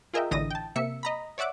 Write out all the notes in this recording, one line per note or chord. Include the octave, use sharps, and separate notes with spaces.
F4 G#4 A#4 D#5 E5 G5
A1 D3 E3 D#5 D#6 A#6
G5 A5
C3 A#3 E5 C#7
D#5 A#5 B5
C#5 D5 E5 F#5 D6